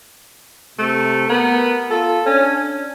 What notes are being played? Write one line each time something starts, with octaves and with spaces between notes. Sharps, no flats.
C3 A3
B3 A#4
F4 A4
C#4 D4